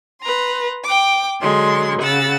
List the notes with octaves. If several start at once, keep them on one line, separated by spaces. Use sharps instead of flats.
B4 A#5 C6
G5 D6
D3 F#3 G#3 C6
C#3 F#5 E6 A6